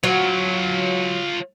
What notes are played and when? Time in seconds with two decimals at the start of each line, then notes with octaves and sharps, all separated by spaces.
0.04 F#3 F4 C#5